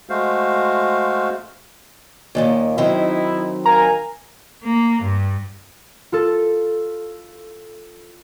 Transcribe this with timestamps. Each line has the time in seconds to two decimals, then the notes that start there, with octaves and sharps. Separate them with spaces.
0.09 G#3 A3 F#4 C5 F5
2.35 D#2 A#2 D#3
2.78 D#3 F#3 C4 D#4 E4
3.66 A#4 F5 G#5 A#5
4.65 A#3
5.03 G2
6.12 F4 A4